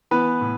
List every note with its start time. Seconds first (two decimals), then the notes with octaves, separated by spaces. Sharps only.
0.11 E3 B3 B4
0.41 A2